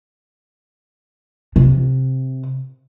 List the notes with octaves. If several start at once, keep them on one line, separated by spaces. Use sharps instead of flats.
C3